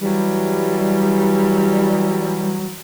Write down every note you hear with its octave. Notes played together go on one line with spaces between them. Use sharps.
E3 F#3 G3